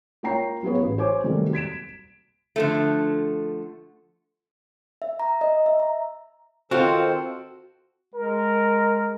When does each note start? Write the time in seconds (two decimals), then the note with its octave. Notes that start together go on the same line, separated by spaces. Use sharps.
0.23 A#3 F4 C#5 G5 A#5 C7
0.63 F#3 B3 G4 G#4 B4 C#5
0.79 A1 B4
0.98 C5 C#5 G#5 D6
1.24 C3 D#3 F#3 G3 A3 A#3
1.53 G#6 B6 D7 E7
2.56 D3 F3 A3
5.02 E5
5.19 A#5
5.41 D#5
5.66 E5
5.79 A#5
6.71 D#3 C4 F4 F#4 A4 C5
8.14 G#3 A#4